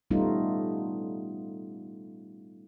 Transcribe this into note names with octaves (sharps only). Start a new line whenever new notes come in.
G3 A3 B3 C#4 D#4 F4